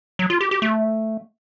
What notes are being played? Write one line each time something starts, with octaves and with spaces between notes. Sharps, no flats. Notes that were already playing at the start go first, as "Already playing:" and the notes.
F#3
F4
G4
G4
A3